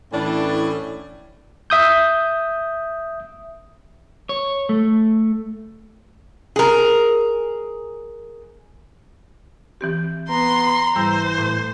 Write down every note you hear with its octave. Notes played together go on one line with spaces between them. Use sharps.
A2 E3 C#4 D4
E5 D#6 G6
C#5
A3
G#4 A#4
E3 C4 G4
B3 A#5 C6
G#2 E3 G3 C5 E6
A2 A3